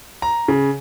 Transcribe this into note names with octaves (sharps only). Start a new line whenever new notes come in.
A#5
C#3